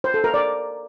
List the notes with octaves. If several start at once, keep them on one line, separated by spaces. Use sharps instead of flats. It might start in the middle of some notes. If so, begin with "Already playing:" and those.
C5
A4
A#4
D5